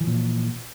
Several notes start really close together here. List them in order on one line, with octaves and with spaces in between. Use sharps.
E3 F3 A#2